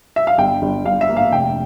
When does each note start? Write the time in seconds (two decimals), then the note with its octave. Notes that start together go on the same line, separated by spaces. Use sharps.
0.16 E5
0.27 F5
0.38 G1 G5
0.62 G1
0.85 G1 F5
1.01 E5
1.09 A#3
1.17 F5
1.32 F1 G5